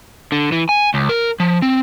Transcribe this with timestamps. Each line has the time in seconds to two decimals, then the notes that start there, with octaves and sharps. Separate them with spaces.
0.32 D3
0.52 E3
0.69 G#5
0.94 C#2
1.09 A#4
1.40 F3
1.62 C4